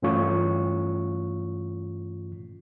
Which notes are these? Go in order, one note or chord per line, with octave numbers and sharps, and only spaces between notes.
G2 E3 A3 C#4 F4 C#6